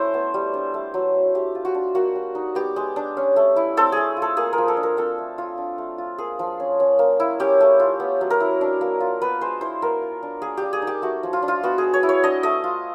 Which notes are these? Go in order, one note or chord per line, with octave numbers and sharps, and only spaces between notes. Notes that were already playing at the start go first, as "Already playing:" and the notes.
Already playing: A3 C#4 E4 C5
B3
G3
D4
A3
F#3
C4
A3 G4
F4
F#4
D4
A#3 F#4
G3
D#4
B3 G4
G#3
D4
C#4
A3
E4
C4 A4
A3 G#4
F4
A4
A#3 G#4
A#4
F3
A4
D4
A#4
C4 A4
A3
F4
D4
A3
F4
A#3 G#4
F3
C#4
C#4
A#3
E4
C#4 G4
A3
F4
B3
F#3
A#4
E4
D4
A#3
F4
B3 B4
G#3 C5
E4 C5
B3 A#4
F4
D4
A#3 G#4
G4
G3
G#4
D#4
G4
A3 F#4
F3
F4
D4
F4
B3 F#4
G#4
G#3
C#5
E4
C#5
D4 D#5
A3 D#5
F4